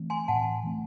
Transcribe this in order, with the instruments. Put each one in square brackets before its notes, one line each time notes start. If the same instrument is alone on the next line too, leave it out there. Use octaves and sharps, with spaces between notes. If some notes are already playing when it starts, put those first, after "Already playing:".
Already playing: [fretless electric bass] E3 A3 C4
[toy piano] G#5 C6
[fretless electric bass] A2 [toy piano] F#5 A5
[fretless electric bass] E3 A3 C4